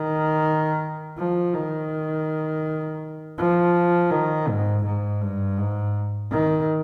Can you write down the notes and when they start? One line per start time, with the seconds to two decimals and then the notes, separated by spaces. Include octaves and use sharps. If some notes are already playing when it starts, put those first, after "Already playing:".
Already playing: D#3
1.18 F3
1.54 D#3
3.38 F3
4.11 D#3
4.48 G#2
4.85 G#2
5.21 G2
5.58 G#2
6.31 D#3